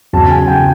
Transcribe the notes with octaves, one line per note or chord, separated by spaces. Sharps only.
E2 C#3 F#3 A5
G#5
C#3 F#3 G5